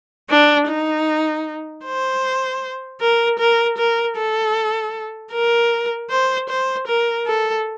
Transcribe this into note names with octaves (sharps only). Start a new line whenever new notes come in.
D4
D#4
C5
A#4
A#4
A#4
A4
A#4
C5
C5
A#4
A4